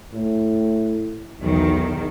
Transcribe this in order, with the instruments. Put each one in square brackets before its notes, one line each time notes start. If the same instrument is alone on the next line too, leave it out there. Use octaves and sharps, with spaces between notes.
[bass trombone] A2
[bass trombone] B1 [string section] E2 D#3